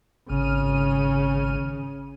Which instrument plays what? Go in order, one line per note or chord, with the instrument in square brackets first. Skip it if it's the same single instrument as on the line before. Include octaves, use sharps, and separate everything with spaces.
[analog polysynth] G#1 F6 D#7 [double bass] C#3